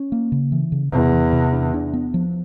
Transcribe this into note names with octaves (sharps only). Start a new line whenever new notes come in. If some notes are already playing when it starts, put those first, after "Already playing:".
Already playing: C#4
A#3
C#3
E3
C#3
E2 C3
E3
C3
D4
D4
B3
F3